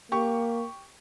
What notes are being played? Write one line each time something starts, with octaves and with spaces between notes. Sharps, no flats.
A#3 G4 C#6